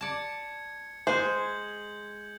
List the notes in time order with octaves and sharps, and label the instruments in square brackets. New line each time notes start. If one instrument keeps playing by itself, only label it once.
[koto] D5 A5 [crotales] G#6 C#7
[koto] G#3 G#4 [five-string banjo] C5 [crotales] G6 F#7